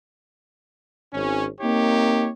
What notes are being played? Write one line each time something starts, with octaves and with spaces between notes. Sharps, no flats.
G#1 C#4
A#3 C4 D#4 G4 C#5